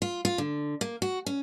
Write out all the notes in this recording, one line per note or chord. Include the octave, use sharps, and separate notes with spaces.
F4
F4
D3
A#3
F#4
C#4